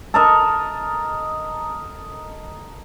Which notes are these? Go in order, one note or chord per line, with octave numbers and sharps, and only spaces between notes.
A4 A#4 D#5